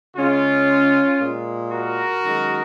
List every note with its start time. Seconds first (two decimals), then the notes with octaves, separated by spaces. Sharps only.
0.17 C#3 G#3 C#4 F4
1.20 A#2 G#3
1.72 F#4 A#4
2.24 F#2 D#3 G#3